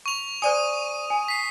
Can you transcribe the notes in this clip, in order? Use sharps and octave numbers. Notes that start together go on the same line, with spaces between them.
C#6 F7
C5 D5 G#5 D#6 D#7
G#5
B6 C7